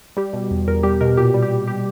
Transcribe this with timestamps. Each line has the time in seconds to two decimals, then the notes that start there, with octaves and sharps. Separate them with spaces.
0.17 G3 G4
0.33 B2
0.51 E2
0.68 E2 A#4
0.83 G3 G4
1.01 B2 A#4
1.17 A#2 G4
1.34 G3
1.42 G4
1.51 A#2
1.67 G3 G4